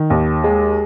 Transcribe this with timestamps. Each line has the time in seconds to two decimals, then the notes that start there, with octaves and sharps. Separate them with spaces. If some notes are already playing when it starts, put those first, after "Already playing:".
Already playing: D#3
0.10 D#2
0.44 G#3